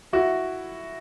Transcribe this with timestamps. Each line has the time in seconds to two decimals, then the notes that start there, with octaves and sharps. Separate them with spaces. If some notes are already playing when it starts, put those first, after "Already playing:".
0.13 E4 F#4